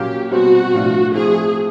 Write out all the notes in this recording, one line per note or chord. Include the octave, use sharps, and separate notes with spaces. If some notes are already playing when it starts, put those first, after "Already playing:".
Already playing: A#2 F#3 A#3 C#4 G4
B2 G3 C4 F#4
A2 F3 A3 D4 F4
F3 A3 C4 E4 G#4